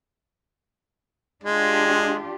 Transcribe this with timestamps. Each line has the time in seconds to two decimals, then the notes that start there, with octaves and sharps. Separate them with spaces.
1.44 G#3 D4 F4 G4